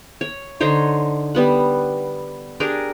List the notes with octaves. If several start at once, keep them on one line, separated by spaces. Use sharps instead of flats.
C#5
D3 D#4 C5 C#5
G3 B3 F#5
D4 G4 G#4 A#4